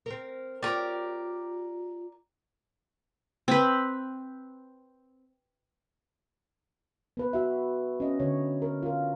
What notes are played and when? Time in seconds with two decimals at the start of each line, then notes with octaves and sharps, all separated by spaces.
0.06 C4 A#4
0.63 F4 G4 A#4 C#5 D5
3.48 C4 B4
7.17 B3 B4
7.33 F#4 E5
8.00 C#4 D#5
8.20 D3 C#5
8.62 A#4
8.83 F4 A#4